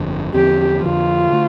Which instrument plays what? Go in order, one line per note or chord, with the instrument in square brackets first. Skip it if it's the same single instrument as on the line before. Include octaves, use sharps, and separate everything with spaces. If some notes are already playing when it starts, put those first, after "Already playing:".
Already playing: [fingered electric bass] G1 F2 D3
[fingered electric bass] E2 D3 F3 C4 [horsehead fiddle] G4
[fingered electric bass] F2 D3 F3 [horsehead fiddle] F4
[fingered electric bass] D3 A3